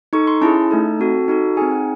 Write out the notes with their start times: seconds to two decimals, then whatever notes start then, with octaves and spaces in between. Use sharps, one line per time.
0.13 D#4 A4 C#6
0.27 C6
0.41 C#4 E4 G#4 A5
0.71 A3 D#4 A4
0.99 C4 F#4 A4
1.28 D#4 F#4 A4
1.57 C4 D#4 G#4 G#5
1.71 F#5